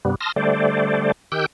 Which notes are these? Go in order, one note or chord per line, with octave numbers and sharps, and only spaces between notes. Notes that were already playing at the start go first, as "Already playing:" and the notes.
G2 C3 G3 B3
A5 C6 D#6 F6 A#6
D3 G3 A3 C5 D5
D#3 G4 G5 E6 F#6 G6